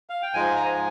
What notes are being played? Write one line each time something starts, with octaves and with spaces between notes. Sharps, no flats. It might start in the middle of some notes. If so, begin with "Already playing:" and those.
F5
G5
G#2 F3 G#3 G#5
A#5
G#5